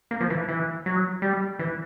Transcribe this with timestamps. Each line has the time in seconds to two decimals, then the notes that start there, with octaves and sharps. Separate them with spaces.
0.11 A#3
0.21 F3
0.30 E3
0.48 E3
0.86 F#3
1.22 G3
1.59 E3